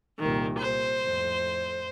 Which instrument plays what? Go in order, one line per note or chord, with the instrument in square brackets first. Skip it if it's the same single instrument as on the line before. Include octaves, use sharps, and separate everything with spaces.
[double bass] C2 A#2 [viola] D#3
[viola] C5
[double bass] F2 A2